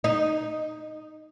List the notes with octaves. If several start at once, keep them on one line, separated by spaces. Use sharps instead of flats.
D#4